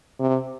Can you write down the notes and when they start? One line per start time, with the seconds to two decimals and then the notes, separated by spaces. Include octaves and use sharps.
0.20 C3